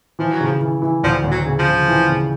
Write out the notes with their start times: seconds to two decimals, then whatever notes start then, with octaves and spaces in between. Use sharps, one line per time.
0.19 E3 F3
0.32 F#3
0.41 C#3 F3
0.61 E3
0.82 E3
1.03 D2 F3
1.24 D2
1.31 F#3
1.46 C#3
1.59 F3
1.67 C#3
1.88 E3
2.09 C#3